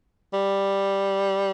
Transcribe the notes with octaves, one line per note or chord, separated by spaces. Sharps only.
G3